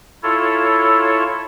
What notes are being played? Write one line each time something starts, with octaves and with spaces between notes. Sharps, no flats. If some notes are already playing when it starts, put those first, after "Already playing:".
E4 F4 A4 C#5